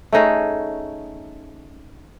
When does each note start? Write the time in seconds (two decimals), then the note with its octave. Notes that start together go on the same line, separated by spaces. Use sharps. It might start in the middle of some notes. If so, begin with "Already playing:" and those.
0.12 A3 C#4 D#4 G#4